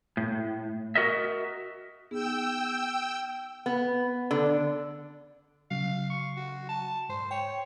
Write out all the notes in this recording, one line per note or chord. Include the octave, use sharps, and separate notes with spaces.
A2
F#4 A#4 D#5 E5
B3 D#4 G#4 G5 E6
B3
D3
C#3 F#3 F5
C#6
F#4
A5
G#2 C5
C#5 G5